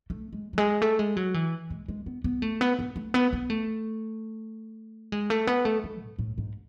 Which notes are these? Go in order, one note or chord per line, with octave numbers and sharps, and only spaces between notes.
A3
G#3
F#3
G#3
A3
G#3
F#3
E3
G#3
G#3
B3
B3
A3
B3
B3
A3
B3
B3
A3
G#3
A3
B3
A3
G#3
A2
A2
G#2